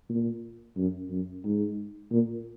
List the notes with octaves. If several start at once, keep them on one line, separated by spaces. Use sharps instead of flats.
A#2
F#2
F#2
G#2
A#2